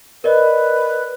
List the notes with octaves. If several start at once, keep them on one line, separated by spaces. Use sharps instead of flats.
A#4 B4 D5 D#5